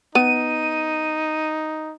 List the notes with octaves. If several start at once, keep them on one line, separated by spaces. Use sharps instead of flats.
B3 D#4 D#7